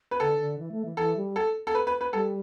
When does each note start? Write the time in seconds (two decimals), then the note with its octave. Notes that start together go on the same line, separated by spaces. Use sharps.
0.11 B4
0.20 D3 A4
0.39 D3
0.58 E3
0.72 A3
0.85 E3
0.97 E3 A4
1.17 G3
1.36 A4
1.67 A4
1.75 B4
1.87 B4
2.01 B4
2.13 G3 A4